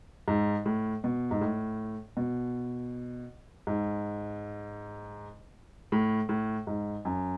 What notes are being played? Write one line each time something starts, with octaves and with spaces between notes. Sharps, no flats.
G#2
A2
B2
G#2
A2
B2
G#2
A2
A2
G#2
F#2